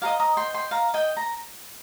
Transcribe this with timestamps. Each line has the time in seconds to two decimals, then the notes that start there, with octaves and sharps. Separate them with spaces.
0.02 G4 C5 D#5 F5 A#5
0.20 A#5 D#6
0.37 G5 C6
0.54 G5 C6
0.71 F5 A#5
0.94 D#5 G5
1.17 A#5